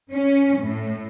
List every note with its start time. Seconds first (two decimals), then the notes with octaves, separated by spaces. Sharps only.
0.12 C#4
0.60 A2